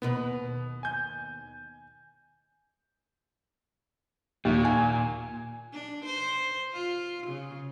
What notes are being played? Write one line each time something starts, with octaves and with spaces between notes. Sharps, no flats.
D#2 B2 B3 B4
G#5 G6
D#2 A#2
G#5
D4
C5
F4
C#3